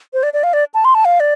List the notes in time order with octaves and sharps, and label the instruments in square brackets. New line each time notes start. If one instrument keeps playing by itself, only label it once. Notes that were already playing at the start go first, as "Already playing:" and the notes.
[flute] C5
D5
D5
F5
D5
A5
C6
A5
F5
D5